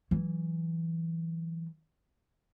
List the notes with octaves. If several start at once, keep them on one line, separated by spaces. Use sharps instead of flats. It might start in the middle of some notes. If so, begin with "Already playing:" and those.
E3 F#3